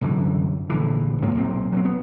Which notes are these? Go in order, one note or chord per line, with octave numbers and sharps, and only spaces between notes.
C2 F#2 D3 E3
A#1 D3 E3
G2 A#2 A#3
B1 A#2 C4
F#3 G#3 C4
B3